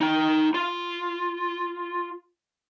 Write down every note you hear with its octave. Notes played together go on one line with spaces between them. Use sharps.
D#4 G5
F4